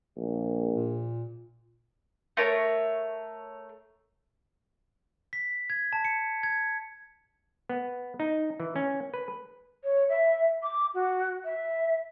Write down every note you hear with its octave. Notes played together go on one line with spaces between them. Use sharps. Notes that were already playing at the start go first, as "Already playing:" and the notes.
A#1
A#2
A3 A#4 C#5
B6
G#6
A5
C#7
G#6
B3
D#4
E3
C#4
B4
C#5
E5
D6
F#4
E5